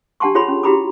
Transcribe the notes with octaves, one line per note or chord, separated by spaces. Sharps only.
D4 G4 F#5 A5 C6 C#6
F4 G#4 C#5 B5 C6
C#4
E4 F#4 G4 A#5 B5 D6